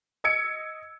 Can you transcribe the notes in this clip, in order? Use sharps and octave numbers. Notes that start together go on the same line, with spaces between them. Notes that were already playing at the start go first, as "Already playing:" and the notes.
D#5 E6 G#6 C#7 D7